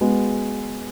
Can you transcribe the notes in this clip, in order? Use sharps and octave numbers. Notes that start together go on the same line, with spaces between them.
G#3 B3 F#4